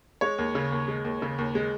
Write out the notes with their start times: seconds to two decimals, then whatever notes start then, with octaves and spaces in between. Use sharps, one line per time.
0.21 G#3 C#5
0.38 D#2
0.55 C#3
0.72 D#2
0.88 G#3
1.05 D#2
1.22 C#3
1.38 D#2
1.55 G#3